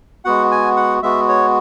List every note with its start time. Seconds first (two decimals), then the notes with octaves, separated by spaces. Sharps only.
0.25 G#3 B3 F#4 F#5
0.52 G#5
0.76 F#5
1.03 G#3 B3 F#4 E5
1.28 C#5